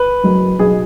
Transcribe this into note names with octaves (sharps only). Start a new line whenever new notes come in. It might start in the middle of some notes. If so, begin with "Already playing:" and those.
Already playing: B4
F#1 F#2 F#3
B1 B2 F#3 G#4